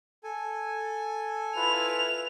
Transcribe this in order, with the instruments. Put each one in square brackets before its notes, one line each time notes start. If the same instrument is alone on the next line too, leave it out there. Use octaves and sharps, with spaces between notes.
[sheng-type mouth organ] A4 G#5
[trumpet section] E4 F4 B4 [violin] F7